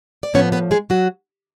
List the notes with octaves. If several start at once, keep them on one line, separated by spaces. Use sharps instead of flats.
D5
A2 F3 B3 C#4 C#5
B3 B4
G#3 G#4
F#3 F#4